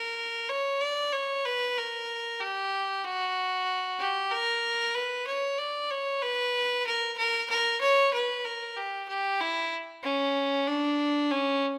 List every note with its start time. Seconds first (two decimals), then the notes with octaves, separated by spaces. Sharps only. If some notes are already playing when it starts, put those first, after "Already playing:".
Already playing: A#4
0.49 C#5
0.81 D5
1.13 C#5
1.45 B4
1.78 A#4
2.41 G4
3.04 F#4
3.99 G4
4.32 A#4
4.95 B4
5.27 C#5
5.58 D5
5.91 C#5
6.22 B4
6.87 A#4
7.18 A#4
7.50 A#4
7.81 C#5
8.14 B4
8.45 A#4
8.77 G4
9.09 G4
9.41 E4
10.04 C#4
10.67 D4
11.31 C#4